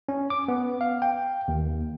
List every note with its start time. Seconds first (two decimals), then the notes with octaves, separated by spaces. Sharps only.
0.09 C#4
0.30 D6
0.48 B3
0.81 F5
1.02 G5
1.48 D#2